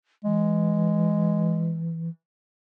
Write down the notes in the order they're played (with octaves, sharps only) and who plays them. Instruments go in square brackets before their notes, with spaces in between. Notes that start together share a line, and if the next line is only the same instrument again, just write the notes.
[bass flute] E3 [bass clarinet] G#3